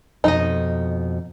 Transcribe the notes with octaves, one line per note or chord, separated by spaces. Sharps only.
F2 B2 D#4 D#5